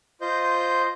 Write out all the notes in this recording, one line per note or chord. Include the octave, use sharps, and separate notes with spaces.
F4 C5 D#5 G6